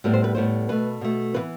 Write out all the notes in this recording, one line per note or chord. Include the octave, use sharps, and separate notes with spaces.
A2 G3 B3
C5
B4
A2 G3 B3 C5
B2 A3 B4
B2 A3
C3 E3 B3 B4